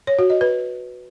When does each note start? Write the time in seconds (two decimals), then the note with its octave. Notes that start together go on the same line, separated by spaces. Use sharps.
0.07 C#5
0.19 F#4
0.30 D#5
0.41 B4